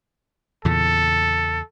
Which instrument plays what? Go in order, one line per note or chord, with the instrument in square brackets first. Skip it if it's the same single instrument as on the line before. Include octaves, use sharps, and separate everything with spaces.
[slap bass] E2 A#2 C#3 [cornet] A4